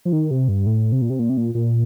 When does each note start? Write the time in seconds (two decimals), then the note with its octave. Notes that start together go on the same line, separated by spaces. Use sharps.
0.05 F3
0.13 D#3
0.31 C3
0.48 G2
0.66 A2
0.92 C3
1.02 A#2
1.10 C3
1.19 A#2
1.29 C3
1.37 A#2
1.55 A#2